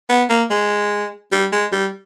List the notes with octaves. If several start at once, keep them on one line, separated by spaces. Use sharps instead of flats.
B3
A#3
G#3
G3
G#3
G3